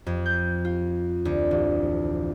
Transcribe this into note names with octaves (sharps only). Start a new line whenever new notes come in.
F2
G6
F4
D2
A1